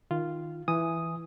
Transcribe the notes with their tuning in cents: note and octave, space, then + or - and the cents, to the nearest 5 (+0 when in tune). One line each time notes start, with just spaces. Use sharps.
D#3 +0 F4 -10
E3 +5 G#5 +0 D#6 +0